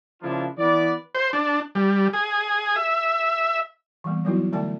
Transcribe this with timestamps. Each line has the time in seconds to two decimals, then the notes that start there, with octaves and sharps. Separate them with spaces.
0.22 C#3 F3 A#3 D4 E4 F4
0.58 E3 B3 B4 D5
1.15 C5
1.33 D4
1.75 G3
2.13 G#4
2.76 E5
4.04 E3 G3 A#3 B3
4.25 F#3 G3 B3 D#4 E4 F#4
4.52 D3 A3 D5 G5 A5